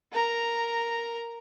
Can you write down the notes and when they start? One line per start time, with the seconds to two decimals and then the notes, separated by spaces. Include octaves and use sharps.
0.12 A#4 A#5